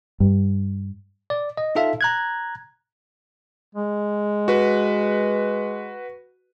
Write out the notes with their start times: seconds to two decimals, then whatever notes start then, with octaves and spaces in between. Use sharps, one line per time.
0.20 G2
1.30 D5
1.57 D#5
1.75 D#4 F4 A4 E5 F5
2.01 A#5 F#6 G#6
3.75 G#3
4.48 F#4 B4